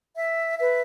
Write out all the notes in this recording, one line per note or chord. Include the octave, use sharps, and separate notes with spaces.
E5
B4 E5